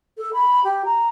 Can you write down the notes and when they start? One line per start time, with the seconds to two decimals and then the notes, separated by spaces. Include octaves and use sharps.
0.17 A4
0.33 B5
0.64 G4
0.85 A#5